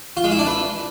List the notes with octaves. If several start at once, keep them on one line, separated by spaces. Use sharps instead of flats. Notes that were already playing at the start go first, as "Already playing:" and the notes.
F4
G#3
E4
D4
B4